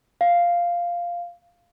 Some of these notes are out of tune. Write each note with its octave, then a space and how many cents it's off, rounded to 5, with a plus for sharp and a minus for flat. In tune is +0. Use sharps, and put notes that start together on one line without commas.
F5 -5